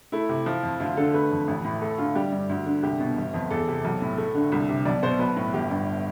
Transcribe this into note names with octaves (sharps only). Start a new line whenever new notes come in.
A3 E4
C3
F3
F2
D2 F4
D3 A4
A3 B4
F2
A1
A2
A3 A4
D3 F4
G3 G4
G2
D2
D3
C2 G4
B2
G1
F2
E2 A4
C3
B1
A2
A3
D3
C2
C3
B1 D5
B2 C5
B1 B4
A2
G1 G4
G2